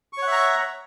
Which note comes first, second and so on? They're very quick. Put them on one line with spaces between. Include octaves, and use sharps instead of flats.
C#6 C#5 F#5 E5 A#5